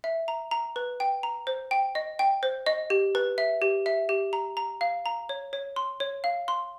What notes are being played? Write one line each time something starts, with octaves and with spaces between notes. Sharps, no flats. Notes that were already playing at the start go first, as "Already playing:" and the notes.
E5
A#5
A#5
B4
G5
A#5
C5
G5
D#5
G5
C5
D#5
G4
B4
E5
G4
E5
G4
A#5
A#5
F5
A#5
C#5
C#5
C6
C#5
F5
C6